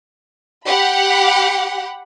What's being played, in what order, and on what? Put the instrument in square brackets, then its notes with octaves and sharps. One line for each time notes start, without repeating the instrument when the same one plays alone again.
[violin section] G4 F#5 B5